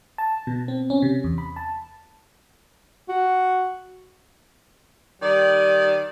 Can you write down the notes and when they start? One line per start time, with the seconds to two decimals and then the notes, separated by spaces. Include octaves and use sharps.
0.18 A5
0.47 B2
0.68 C4
0.90 C#4
1.02 C3
1.24 E2
1.38 B5
1.56 A5
3.09 F#4
5.22 D#3 G3 D5